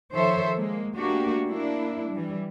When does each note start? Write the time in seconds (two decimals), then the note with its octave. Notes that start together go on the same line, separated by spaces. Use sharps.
0.12 D#3 F3 A4 C5 C#5 E5
0.56 G#3 A#3
0.95 A3 A#3 D4 F#4 G4
1.47 A#3 D4 E4
2.12 E3 G3